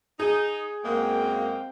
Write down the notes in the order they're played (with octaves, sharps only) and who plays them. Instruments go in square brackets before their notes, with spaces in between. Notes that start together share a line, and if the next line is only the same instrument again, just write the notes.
[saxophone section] D#4 [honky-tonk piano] G#4
[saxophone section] F#2 G#3 A#3 [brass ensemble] C4 F5 G5